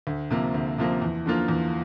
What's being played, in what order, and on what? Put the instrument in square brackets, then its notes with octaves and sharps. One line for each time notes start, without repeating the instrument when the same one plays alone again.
[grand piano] D2
C3 F3 A#3
D2
C3 F3 A#3
E2
D3 F3 A#3 F4
E2